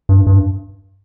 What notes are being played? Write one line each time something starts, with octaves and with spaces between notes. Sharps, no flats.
G2
G2